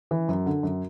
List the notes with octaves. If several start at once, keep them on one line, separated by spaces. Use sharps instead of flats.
E3
F#2
D3
F#2